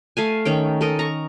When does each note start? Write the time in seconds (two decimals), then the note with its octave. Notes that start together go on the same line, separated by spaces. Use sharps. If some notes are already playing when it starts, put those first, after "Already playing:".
0.17 A3 F5 G#5
0.45 D#3 C#4 G5
0.81 A4 A#4 D#5
0.99 A#5 C#6